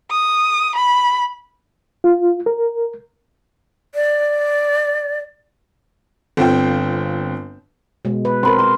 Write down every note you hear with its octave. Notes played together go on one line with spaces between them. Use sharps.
D#6
B5
F4
A#4
D5
G1 C4 F4 G5
B2 G#3
B4
C4 A#4 B5 C6
C6